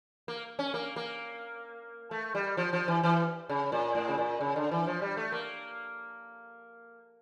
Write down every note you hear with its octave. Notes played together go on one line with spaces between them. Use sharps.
A#3
C#4
A#3
A#3
A3
G3
F3
F3
E3
E3
C#3
A#2
A2
C#3
A#2
C#3
D3
E3
F3
G3
A3
A#3